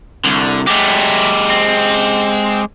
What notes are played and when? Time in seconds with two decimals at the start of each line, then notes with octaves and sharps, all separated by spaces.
0.24 C2 D3
0.67 F#3 G#3 A3 G4
1.50 C4